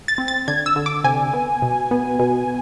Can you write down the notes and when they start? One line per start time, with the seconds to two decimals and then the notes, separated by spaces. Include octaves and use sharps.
0.08 A6
0.18 C4
0.28 A6
0.48 D3 G#6
0.66 E6
0.76 D3
0.86 D6
1.04 C3 G#5
1.33 B3
1.62 B2
1.91 B3
2.19 B2